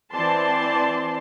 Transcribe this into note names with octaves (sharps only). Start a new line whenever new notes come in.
E3 C4 D5 A5 C6